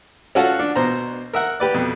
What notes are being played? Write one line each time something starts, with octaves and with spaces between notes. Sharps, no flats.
C#4 F4 F#4 A4 F#5 A5
D4
B2 C5 A#5
A#4 E5 F#5
G4 B4 D5
F2 B2